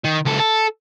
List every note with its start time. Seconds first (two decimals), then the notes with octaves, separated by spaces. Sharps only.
0.04 D#3
0.25 C#2 A4
0.39 A4